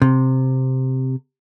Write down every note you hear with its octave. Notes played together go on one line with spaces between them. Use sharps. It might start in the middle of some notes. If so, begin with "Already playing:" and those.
C3